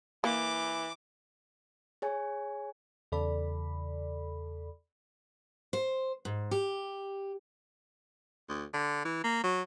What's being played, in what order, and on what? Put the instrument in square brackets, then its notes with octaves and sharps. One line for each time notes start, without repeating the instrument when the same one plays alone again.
[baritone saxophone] E3 [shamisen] A#3 [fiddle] D6
[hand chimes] G#4 C#5 G#5
[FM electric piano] E2 C#3 A4 D5 B5
[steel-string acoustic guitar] C5
G#2
G4
[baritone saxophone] D2
D3
E3
A#3
F#3